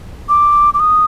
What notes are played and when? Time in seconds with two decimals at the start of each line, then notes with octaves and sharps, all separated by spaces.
0.29 D6
0.74 D6
0.80 D#6